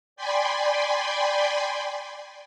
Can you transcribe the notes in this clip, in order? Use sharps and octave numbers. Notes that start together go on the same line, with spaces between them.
D5 G5 G#5 B5 C6